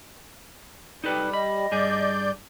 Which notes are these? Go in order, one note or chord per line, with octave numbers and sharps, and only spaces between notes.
G3 D#4 A4 B4
D#5 B5
G2 G#4 D5 G6